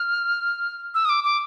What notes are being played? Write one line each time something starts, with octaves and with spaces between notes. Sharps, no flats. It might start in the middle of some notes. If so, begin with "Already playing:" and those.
Already playing: F6
E6
D#6
D6
D6